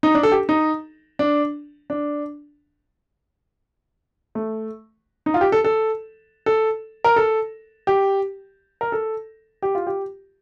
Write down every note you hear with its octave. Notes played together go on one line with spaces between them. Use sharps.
D#4
D4
A4
G4
D#4
D4
D4
A3
D#4
F4
G4
A4
A4
A4
A#4
A4
G4
A#4
A4
G4
F4
G4